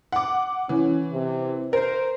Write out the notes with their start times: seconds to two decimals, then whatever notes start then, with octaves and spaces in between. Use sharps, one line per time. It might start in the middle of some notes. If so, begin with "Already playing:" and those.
0.12 F#5 D6
0.69 E3 C#4
1.12 C3
1.73 A#4 C5